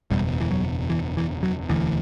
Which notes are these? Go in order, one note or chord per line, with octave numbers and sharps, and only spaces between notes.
F#1 E2 B2 G3
E3
F#3
E3
E3
F#3
E1 D2 D3 E3